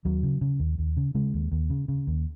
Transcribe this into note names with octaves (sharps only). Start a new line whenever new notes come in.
D#2 F#3
C#3
C#3
D#2
D#2
C#3
C#3 G#3
D#2
D#2
C#3
C#3
D#2